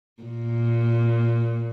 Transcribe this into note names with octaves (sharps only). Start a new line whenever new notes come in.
A#2